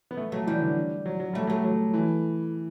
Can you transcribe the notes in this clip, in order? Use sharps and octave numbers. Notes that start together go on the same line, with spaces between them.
B3
A3
F#3 A3
E3 G3
D3
F#3
F#3
G3 A3
F#3 A3
F#3
E3